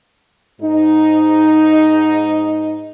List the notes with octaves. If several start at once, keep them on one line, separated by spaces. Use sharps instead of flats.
G#2 D#4